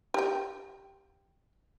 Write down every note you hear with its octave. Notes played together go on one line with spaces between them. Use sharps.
G4 G5